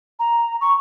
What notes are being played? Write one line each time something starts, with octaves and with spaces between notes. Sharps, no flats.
A#5
C#6